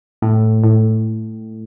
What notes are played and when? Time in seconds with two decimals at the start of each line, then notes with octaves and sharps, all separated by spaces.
0.22 A2
0.64 A2